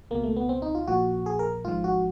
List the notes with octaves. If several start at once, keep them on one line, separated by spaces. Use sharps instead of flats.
C#2 B2 A#3
A3
B3
C4
D#4
F4
A#1 A#2 F3 F#4
G#4
A#4
G#1 G#2 F3 F4
F#4